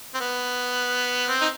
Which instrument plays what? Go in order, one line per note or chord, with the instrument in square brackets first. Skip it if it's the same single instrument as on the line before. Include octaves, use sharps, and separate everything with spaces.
[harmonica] C4
B3
C4
D#4